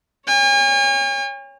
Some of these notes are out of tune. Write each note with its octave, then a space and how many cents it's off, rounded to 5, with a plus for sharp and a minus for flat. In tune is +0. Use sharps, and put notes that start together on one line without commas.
C#5 +0 G#5 -45